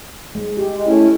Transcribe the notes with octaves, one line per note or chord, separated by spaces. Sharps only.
G#3
G4
G#3
A3 C#4 E4